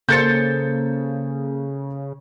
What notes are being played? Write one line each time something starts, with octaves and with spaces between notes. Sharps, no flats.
C#3 A#3 A4 C5 G6 A6 C#7